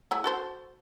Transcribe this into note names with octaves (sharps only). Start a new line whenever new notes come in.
A3 E4 G#4
F#4 A4 C5